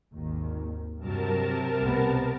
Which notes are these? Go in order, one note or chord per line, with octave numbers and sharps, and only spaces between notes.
G#1 D#2 D#3
G2 C3 F#3 A#4 A5
C2 B2 B3